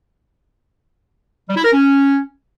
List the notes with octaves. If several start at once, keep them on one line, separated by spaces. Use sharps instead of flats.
G3
E4
A#4
C#4